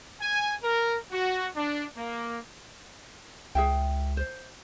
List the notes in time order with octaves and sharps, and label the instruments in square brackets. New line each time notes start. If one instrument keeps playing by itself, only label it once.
[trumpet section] G#5
A#4
F#4
D4
A#3
[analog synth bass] C#2 [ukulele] G#4 E5 G5
[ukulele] C5